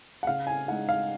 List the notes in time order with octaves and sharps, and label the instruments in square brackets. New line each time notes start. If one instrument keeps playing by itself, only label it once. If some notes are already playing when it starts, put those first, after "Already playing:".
[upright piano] F#5
C#3 F5
G#5
G#3 D#4 F#5
F5